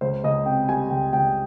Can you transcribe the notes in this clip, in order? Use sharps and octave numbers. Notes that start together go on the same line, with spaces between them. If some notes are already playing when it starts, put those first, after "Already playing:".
C#2 C5
C#2 D#5
C3 G5
G3 G#5
C#2 G5
C#2 G5